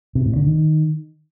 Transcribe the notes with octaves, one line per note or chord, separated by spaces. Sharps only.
C3
A2
D3
D#3